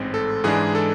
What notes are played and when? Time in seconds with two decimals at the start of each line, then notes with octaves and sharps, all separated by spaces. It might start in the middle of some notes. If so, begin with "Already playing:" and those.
Already playing: A1 G#2 G#3 C4
0.14 A4
0.44 G#2 E3 G#3 D4 G#4
0.75 A4